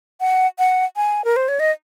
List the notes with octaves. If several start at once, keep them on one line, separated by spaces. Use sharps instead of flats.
F#5
F#5
G#5
A#4
C5
C#5
D#5